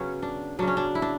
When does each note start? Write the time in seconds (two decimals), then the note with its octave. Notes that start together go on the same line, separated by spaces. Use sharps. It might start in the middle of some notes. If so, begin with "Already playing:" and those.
Already playing: C#3 F#3 B3 C#4
0.23 D4
0.59 C#3 F#3 D4
0.67 C#4
0.77 D4
0.95 E4
1.02 D4